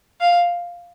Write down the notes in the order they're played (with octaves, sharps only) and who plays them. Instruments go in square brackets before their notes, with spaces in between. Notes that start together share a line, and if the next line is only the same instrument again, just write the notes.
[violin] F5